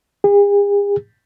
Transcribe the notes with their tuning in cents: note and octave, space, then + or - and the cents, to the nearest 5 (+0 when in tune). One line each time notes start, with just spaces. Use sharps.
G#4 -45